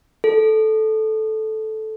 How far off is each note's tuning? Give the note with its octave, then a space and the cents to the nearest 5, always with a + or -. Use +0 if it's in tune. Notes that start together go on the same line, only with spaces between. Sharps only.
A4 -10